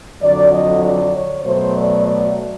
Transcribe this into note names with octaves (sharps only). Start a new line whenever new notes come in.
F2 D3 F#3 D5
D#5
D5
C#5
B2 F#3 A3 C5
D5
D5